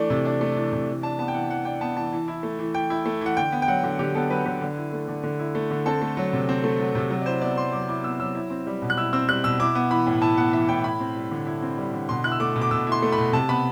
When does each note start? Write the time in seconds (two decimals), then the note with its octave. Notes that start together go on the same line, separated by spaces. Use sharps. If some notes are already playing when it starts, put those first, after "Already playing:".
Already playing: E3 A3 D4 D5
0.10 C3
0.25 D4
0.41 A3
0.56 E3
0.73 C3
0.88 E3
1.03 D4 A5
1.19 B3 A5
1.28 G5
1.34 E3 F#5
1.50 E3 F#5
1.65 D4 G5
1.81 B3 A5
1.97 E3 A5
2.12 E3
2.28 E4
2.43 A3
2.59 E3
2.74 E3 G5
2.90 E4
3.06 A3
3.21 E3 F#5
3.37 D3 G5
3.52 B3
3.62 G5
3.68 F#3 F#5
3.84 D3
3.99 D3 G4
4.15 B3 A4
4.30 F#3 B4
4.46 D3 B4
4.61 D3
4.77 E4
4.93 A3
5.08 D3
5.23 D3
5.39 E4
5.55 A3
5.70 D3
5.86 C4 A4
6.02 A3
6.17 F#3
6.33 C3
6.49 C4
6.64 A3
6.79 F#3
6.95 C3
7.11 F#3
7.21 D5
7.26 E4 C5
7.42 B3 D5
7.57 F#3 C6
7.73 F#3 D6
7.88 E4 D6
8.04 B3 E6
8.19 F#3 E6
8.35 E4
8.50 C4
8.67 G3
8.82 B2
8.90 F#6
8.97 E4 E6
9.13 C4 E6
9.29 G3 F#6
9.44 B2 E6
9.59 E4 D6
9.75 B3
9.91 E3 B5
10.07 A2
10.22 E4 A5
10.37 B3 F#5
10.53 E3 E5
10.69 A2 G5
10.84 E4 B5
11.00 C4
11.15 G3
11.31 D3
11.47 E4
11.62 C4
11.78 G3
11.93 D3
12.09 B2 C6
12.24 E4 F#6
12.32 E6
12.40 A3 D6
12.55 B2
12.61 D6
12.71 B2 E6
12.87 E4 C6
13.02 A3
13.12 B5
13.18 B2
13.33 C3 A5
13.49 B3 B5